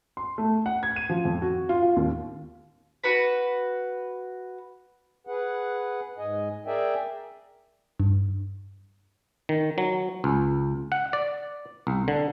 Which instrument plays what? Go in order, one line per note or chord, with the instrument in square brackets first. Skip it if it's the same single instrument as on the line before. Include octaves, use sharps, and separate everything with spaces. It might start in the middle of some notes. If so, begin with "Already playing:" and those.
[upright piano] C6
A3
F#5
G#6
D#7
F3
F2
F#4
F4
F4
D#2
[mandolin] F#4 B4 B5
[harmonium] G#4 B4 F#5
G#2 D#5 G#5
G#4 A#4 D5 E5 G5 G#5
[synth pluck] G2
[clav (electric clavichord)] D#3
F#3
C#2
F#5
D5
C2
D3